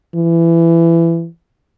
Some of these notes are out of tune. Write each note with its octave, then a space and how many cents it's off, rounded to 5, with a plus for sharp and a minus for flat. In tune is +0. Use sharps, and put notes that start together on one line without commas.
E3 +20